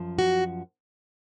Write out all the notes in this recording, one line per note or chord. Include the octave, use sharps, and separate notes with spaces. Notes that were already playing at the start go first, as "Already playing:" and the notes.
Already playing: F#2 F3
F#4